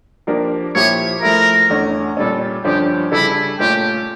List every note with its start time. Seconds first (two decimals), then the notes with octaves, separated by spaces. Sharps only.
0.27 F3 A#3 D4 G4 A#4
0.75 A#2 F3 A#3 E4 G4 C#5
1.22 F3 A3 E4 A#4
1.70 E2 D3 A3 C#4
2.17 A#2 G3 C#4 A4
2.64 G2 D3 F3 C#4 G4
3.12 C#3 G3 D4 E4 A4
3.59 A#2 A3 C#4 F4 G4 A4